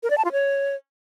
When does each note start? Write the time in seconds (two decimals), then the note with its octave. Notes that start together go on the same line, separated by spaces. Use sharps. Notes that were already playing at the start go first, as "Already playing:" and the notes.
0.03 A#4
0.10 D5
0.18 A5
0.25 F4
0.32 C#5